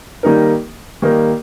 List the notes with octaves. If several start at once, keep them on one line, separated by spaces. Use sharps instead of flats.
D#3 G3 A#3 D#4 A#4
D#3 G3 A#3 D#4 A#4